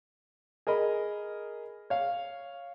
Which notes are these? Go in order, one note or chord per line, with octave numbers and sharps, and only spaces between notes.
G#4 A#4 D#5 B5
C#5 F5